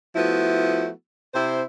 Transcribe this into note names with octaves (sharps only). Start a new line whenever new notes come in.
F3 A3 B3 E4 F#4
C3 E4 C5